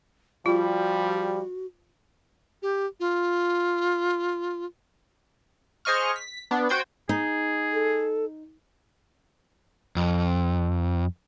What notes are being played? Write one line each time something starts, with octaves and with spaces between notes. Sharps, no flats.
F3 G3 F4 F#4
G4
F4
G#4 C5 D#5 C#6 F6
B6
B3 D4
F#4 C5 G5 G6 G#6
D#4 G#4
A4
F2